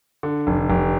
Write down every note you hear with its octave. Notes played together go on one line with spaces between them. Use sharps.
D3
F1
F1